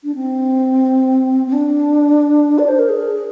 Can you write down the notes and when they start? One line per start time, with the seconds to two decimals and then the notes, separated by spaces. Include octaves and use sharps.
0.04 D4
0.15 C4
1.47 C4
1.53 D4
2.59 D5
2.68 C5
2.79 A#4
2.89 G#4